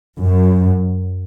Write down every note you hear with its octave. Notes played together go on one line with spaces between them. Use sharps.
F#2